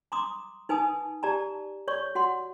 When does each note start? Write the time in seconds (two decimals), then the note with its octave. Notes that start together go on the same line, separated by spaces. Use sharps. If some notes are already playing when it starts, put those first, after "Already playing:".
0.12 A#5 C6 D6 D#6
0.69 D#4 B4 G#5 A5 D#6
1.23 G4 D5 A5 A#5
1.88 C#5 D5 C#6
2.15 F#4 F#5 C6